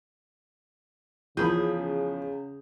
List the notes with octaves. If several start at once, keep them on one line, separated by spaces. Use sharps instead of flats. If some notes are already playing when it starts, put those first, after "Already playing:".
E2 C#3 F3 G#4 B5 G6